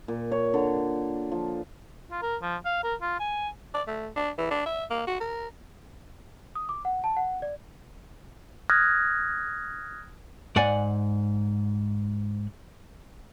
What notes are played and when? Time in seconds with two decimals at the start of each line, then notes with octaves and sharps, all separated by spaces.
0.08 A#2
0.31 C#5
0.54 D3
1.32 F3
2.11 F4
2.22 A#4
2.42 F3
2.65 F5
2.84 A#4
3.02 F4
3.20 G#5
3.74 D5
3.87 A3
4.16 D4
4.38 E3
4.51 D4
4.66 E5
4.90 A#3
5.07 F#4
5.20 A#4
6.55 D#6
6.69 D6
6.85 F#5
7.04 A5
7.17 F#5
7.42 D5
8.70 D#6 F6 F#6 G#6 A#6
10.56 G#2 D5 F#5 G#5